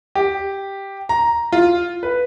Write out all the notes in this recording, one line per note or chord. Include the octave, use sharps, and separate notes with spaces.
G4
A#5
F4
B4